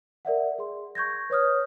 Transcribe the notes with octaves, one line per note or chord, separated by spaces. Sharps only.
A#4 D5 E5 F#5
G#4 C6
C#6 G6 G#6 A#6
B4 C#5 D#6 F6